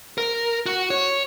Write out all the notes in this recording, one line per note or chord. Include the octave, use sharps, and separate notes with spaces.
A#4
F#4
C#5